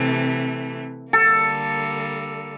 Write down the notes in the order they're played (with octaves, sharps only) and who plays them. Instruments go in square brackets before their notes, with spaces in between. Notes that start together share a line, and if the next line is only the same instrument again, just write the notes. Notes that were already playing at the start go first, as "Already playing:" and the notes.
Already playing: [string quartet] C3 E3 A3
[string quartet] D3 G3 A#3 [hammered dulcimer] A4